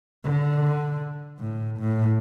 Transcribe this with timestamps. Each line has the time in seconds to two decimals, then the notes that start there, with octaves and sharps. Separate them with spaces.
0.24 D3
1.39 A2
1.80 A2